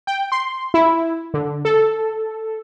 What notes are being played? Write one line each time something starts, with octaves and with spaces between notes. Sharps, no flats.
G5
C6
E4
D3
A4